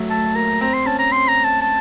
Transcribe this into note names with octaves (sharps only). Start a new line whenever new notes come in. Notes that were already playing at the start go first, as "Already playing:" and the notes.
Already playing: F#3 A3
A3 A5
A#3 A#5
C4 A#5
C6
C#4 A5
A#5
C4 C6
A#5
A5
A5